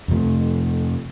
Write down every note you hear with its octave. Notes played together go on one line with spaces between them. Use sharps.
F2 C3 F3 A3